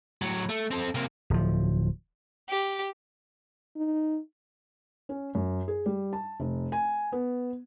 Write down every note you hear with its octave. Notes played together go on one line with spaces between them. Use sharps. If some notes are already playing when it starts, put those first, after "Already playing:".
A2 F#3
A3
C4 A4
C3 A#3
D1 F3
G4
D#4
C#4
F#2
G#4
G3
A5
F1
G#5
B3